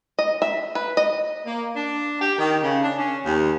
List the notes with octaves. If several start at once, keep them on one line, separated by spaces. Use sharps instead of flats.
D#5
E5
B4
D#5
A#3
D4
G4
D#3
C#3
D4
C#4
D#2